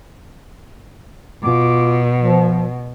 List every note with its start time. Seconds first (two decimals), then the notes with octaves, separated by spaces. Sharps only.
1.43 B2 F4 D6
2.20 F3